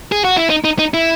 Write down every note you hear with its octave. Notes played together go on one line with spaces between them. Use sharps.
G#4
F#4
E4
D#4
D#4
D#4
E4